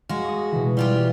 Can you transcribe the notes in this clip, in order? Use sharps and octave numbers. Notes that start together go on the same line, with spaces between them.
G#3 F#4 F5
C#6 D#6
B2 E3
G3 E4 F4 G4 E6